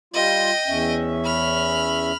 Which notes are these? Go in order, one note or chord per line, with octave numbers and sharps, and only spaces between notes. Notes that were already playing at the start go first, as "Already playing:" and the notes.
G3 F4 D#5 G5
E2 C#4 E5
B5 F6